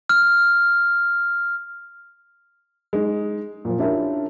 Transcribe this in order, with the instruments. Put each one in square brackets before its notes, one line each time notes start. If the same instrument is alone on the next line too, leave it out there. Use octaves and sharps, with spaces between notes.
[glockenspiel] F6
[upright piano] G#3 D#4
A#2 F3
C#4 D4 E4 F4 G4 A#4